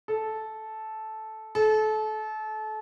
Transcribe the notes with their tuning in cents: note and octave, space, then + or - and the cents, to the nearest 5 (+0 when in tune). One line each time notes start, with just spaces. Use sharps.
A4 -10
A4 -30